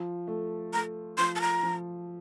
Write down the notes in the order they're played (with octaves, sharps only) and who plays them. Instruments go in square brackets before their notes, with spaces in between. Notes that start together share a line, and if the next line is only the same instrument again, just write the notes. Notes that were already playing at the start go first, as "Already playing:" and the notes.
Already playing: [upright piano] F3
A3
[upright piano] A3 [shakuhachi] A#5
[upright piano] F3 [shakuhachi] C6
[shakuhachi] A5
A#5
[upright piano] F3